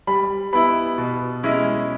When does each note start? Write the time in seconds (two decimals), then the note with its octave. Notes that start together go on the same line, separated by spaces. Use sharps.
0.07 G3 B5
0.53 B3 E4 B5
0.98 B2
1.43 G#3 C#4 E4